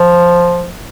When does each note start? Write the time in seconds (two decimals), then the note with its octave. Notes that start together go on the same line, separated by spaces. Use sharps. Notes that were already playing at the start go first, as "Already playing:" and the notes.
Already playing: F3